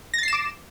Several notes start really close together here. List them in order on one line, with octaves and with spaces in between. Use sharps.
A#6 A6 C7 E7 D6